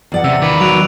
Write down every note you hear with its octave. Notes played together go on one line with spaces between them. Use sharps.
E2 D5 F#5
C3 E6
D#3 B4 D6 F#7
F#3 F#6 D7 F7